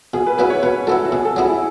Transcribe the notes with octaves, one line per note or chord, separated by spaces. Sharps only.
B2 G#4
B4
F#3 B3 E4 B4
C#5
B2 B4
F#3 B3 E4 A4
F#4
B2 G#4
A4
F#3 B3 E4 G#4
E4